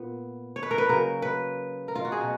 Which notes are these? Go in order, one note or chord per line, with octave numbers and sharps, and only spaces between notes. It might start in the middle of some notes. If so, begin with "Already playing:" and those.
Already playing: A#2 B3
C#5
B4
A#4
B4
C#3 F#3 A#3 A#4
B4
A#4
F4
F#4
G#4
B2 F#3